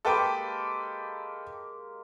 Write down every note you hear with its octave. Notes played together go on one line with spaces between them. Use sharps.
G#3 A#3 G4 A4 B4 G5